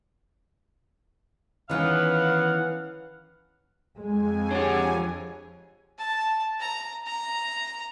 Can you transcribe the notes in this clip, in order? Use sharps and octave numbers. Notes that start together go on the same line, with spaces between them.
D#3 E3 B3 C#4 F5 F#5
F2 G#3 G#5
D4 G4 G#4 C#5 F#5
A5
A#5
A#5